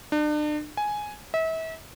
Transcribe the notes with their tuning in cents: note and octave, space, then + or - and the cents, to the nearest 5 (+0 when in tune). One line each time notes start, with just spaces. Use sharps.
D4 +40
G#5 +5
E5 -35